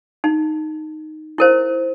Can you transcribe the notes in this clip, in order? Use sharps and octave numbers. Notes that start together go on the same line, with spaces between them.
D#4
E4 A#4 C5